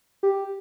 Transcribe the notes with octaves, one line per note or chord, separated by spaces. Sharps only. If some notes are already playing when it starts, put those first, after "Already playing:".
G4